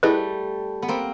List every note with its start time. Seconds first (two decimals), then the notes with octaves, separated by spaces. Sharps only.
0.03 G3 A3 E4 G#4 B4 D#5
0.82 B3
0.88 A#3 C4